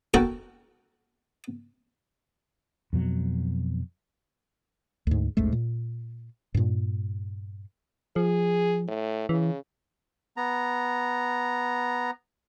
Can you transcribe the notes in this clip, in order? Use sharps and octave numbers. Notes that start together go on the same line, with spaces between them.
F#4 A4 A#4 G5
F2 B2 F#3
D2 G#2
A1 D#2 G#2 A3
A#2
G2 A#2
F3 G#4
A2
C#3 E3
B3 A#5